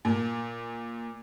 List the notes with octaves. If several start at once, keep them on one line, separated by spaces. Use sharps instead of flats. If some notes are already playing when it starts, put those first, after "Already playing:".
A#2